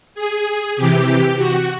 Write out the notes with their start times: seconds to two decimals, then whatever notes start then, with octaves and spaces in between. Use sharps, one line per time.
0.15 G#4
0.76 C3 E3 G4
1.37 F#4